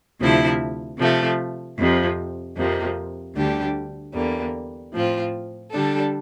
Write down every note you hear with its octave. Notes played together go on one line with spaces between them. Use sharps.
D2 C3 F3 A3 E4
C3 F3 A3
F2 C3 F3
F2 C3 F3 A#3
D2 D3 G3 D4 G4
E2 D3 G3 A#3
A2 F3 C4 F4
D3 G3 D4 A4